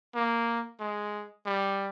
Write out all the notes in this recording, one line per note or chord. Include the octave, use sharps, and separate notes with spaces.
A#3
G#3
G3